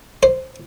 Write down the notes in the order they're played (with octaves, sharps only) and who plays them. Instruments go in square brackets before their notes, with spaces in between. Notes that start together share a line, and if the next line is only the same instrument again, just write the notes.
[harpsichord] C5